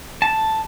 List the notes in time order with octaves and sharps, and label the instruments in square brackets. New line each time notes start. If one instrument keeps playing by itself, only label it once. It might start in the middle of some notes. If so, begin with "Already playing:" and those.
[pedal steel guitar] A5